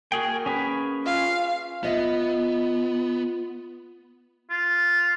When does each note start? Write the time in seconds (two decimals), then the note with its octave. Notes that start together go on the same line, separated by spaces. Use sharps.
0.12 A#3 F#4 G#4 G5
0.46 C#4 G#4 B4
1.06 F4 F5
1.83 B3 F4 D#5 E5
4.50 F4